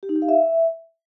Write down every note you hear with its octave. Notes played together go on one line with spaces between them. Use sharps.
G4
D#4
G4
F5
E5